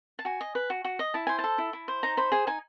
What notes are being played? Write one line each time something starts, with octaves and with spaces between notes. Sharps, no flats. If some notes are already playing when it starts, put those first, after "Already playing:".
A5
F#4 G#5
D#5
B4
F#4
F#4
D#5
E4 A5
C5 G#5
A5
A4
E4
E4
C5
D#4 A#5
C5 B5
G#4 G#5
D#4 G#5